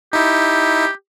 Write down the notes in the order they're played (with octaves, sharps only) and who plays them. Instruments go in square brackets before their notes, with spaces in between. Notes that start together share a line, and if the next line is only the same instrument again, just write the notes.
[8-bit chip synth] D#4 E4 [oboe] G4